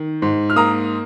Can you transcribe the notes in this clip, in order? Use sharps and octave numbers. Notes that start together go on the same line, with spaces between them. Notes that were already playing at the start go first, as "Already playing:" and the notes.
Already playing: D#3
G#2
F6
A#3 A#5 D#6